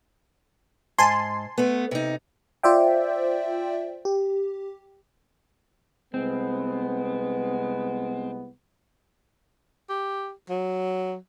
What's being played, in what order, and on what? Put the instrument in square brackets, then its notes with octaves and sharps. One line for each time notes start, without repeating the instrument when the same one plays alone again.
[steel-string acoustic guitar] G#2 [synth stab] G#5 A5 C6
[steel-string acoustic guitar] A3 B3
C3 D#4
[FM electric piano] F4 C5 D5 E5 G5
G4
[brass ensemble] C2 G#3 B3 [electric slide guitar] C4
[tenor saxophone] G4
F#3